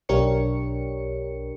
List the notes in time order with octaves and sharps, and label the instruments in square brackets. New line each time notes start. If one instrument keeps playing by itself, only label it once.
[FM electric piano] B1 D4 G4 A#4 C#5 C#7